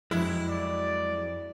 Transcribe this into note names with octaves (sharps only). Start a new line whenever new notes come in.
F2 F#3 G#3 E4
D5